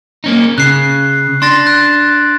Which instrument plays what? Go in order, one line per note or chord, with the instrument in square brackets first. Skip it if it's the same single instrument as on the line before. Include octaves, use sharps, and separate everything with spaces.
[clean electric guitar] A#3 C#4 D#4
[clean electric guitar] C#3 [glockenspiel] F#6 C7
[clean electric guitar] D4 [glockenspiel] C6 A6 A#6
[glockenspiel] F#6